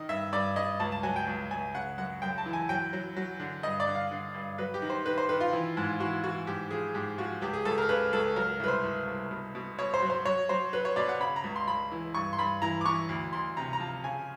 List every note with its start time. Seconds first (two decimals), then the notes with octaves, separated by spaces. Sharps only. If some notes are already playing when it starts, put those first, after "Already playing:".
Already playing: D#3 D#5
0.09 G2 E5
0.32 G2 D5
0.56 G2 D#5
0.80 C#2 A5
0.92 A5
1.03 F#3 G#5
1.16 G5
1.27 C#2
1.51 C#2 G#5
1.75 C#3 F#5
1.98 F#2 F#5
2.22 F#2 G5
2.38 A5
2.46 E3
2.53 G#5
2.69 F#3 G5
2.93 F#3
3.17 F#3
3.40 D3
3.63 G2 D#5
3.80 D5
3.87 D3
3.95 F5
4.11 D3
4.34 G2
4.58 F#3 B4
4.74 G4
4.82 D#3
4.90 C5
5.06 D#3 B4
5.18 C5
5.29 D#3 B4
5.40 F4
5.53 E3
5.77 G#2
6.00 E3 F#4
6.24 E3 F#4
6.47 G#2 G4
6.71 F3 G#4
6.94 G#2 G4
7.18 F3 F#4
7.42 C#2 G4
7.53 G#4
7.65 C#2 A4
7.78 A#4
7.89 C#3 B4
8.13 C#2 A4
8.36 F#3 A#4
8.60 C2 B4
8.68 C5
8.84 C2
9.07 C2
9.31 B2
9.55 B2
9.78 B2 C#5
9.94 C5
10.02 F#3
10.10 C5
10.25 F#3 C#5
10.49 F#3 C5
10.73 F#3 B4
10.85 C#5
10.96 B2 D5
11.09 F#5
11.20 C#3 B5
11.36 A#5
11.44 C#2
11.56 C6
11.67 C#2 B5
11.91 E3
12.15 G2 C#6
12.33 C6
12.38 G2 B5
12.62 E3 A#5
12.81 D6
12.86 E3 C#6
13.09 D2
13.33 D2 C6
13.57 C3 A#5
13.73 A#5
13.80 F3 A5
14.04 C#3 G#5